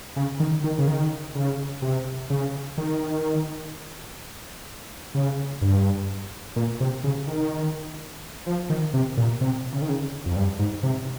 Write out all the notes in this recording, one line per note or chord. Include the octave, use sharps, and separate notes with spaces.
C#3
D#3
D#3
C#3
D#3
C#3
C3
C#3
D#3
C#3
G2
A#2
C3
C#3
D#3
F3
D#3
C3
A#2
C3
C#3
D#3
C#3
F2
G2
G#2
C3